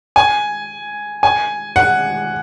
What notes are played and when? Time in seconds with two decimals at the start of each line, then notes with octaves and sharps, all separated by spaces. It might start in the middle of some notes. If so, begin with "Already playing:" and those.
0.16 G#5
1.23 G#5
1.76 F#5